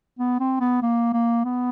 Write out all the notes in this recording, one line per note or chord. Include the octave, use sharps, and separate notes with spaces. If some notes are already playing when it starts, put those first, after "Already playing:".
B3
C4
B3
A#3
A#3
B3